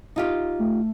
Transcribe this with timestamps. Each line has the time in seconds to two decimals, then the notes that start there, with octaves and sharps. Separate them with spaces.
0.16 D#4 F4 G4
0.59 A3